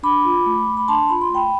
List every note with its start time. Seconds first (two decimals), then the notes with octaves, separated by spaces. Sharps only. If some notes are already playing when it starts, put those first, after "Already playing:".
0.03 D4 B5 D6
0.25 F4
0.46 A3
0.67 A3
0.77 B5
0.88 D4 A5 C6
1.09 F4 B5
1.21 C6
1.30 A3 G5 B5